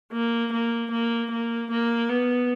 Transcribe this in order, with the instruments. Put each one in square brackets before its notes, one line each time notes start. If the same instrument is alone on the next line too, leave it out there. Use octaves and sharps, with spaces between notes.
[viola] A#3
A#3
A#3
A#3
A#3
B3